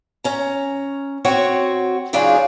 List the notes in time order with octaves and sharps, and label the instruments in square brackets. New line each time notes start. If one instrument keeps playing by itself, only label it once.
[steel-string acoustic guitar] C#4 A#5
C4 F#4 C#5
C#3 F#3 D4 D#4 F4 G#4